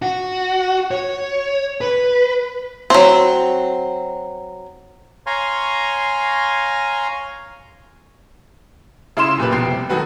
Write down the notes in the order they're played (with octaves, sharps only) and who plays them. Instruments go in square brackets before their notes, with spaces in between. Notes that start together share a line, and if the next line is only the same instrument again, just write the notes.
[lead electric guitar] F#4
C#5
B4
[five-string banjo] F#3 C4
[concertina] C#5 F5 G#5 A#5 C6
[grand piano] C#3 E4 F4 C6 E7
F#1 A#2 G4 B4
F1 B2 G5 C7
C3 G3
D#3 F#3 F#4 A4 B4